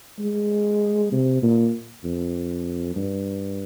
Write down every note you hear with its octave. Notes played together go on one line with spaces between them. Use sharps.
G#3
C3
A#2
F2
G2